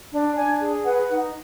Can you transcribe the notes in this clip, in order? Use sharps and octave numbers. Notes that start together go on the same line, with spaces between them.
D4
D4 G#5
G#4
B4 F#5
D#4